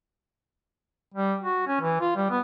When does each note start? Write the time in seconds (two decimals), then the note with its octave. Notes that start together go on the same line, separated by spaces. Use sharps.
1.14 G3
1.43 F#4
1.67 C#4
1.81 E3
2.00 F4
2.16 G3
2.30 B3